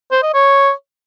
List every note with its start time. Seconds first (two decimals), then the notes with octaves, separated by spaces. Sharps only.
0.12 C5
0.23 D#5
0.34 C#5